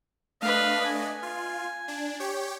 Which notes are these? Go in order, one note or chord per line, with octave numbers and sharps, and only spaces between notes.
A3 D4 B4 D#5 F5
G#5
F4
D4
G4 C#5 G5